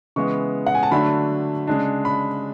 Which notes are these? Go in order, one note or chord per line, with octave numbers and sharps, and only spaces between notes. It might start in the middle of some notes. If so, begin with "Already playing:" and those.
C#3 E3 G#3 B3 C#6
F#5
G#5
A5
D3 F#3 A3 D4 B5
C#3 G#3 D4
B5